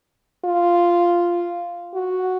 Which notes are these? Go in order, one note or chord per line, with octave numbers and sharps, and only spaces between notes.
F4
F#4